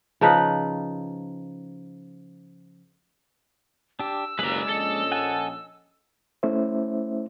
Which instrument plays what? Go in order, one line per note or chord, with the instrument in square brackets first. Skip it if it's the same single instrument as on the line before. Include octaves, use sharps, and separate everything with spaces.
[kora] C#3 F3 D#4 B4
[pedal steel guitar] D4 G4 [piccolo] E6
[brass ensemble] F#1 D#2 [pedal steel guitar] G#3 D5 [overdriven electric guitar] B4 A#5
[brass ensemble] A#1 C#4 D#5 [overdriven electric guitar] A4
[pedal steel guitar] F#5 G#5 A5
[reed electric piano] A3 C#4 E4 C5 E5